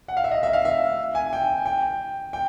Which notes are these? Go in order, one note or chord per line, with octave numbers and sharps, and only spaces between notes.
F#5
F5
E5
D#5
E5
F5
E5
G#5
G5
G5
G5